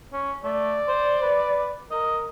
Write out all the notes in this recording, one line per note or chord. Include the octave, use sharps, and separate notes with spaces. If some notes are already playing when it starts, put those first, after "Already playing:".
C#4
A3 D5
C5
B4
A#4 D#5